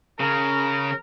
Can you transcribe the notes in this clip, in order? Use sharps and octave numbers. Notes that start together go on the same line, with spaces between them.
C#3 A#4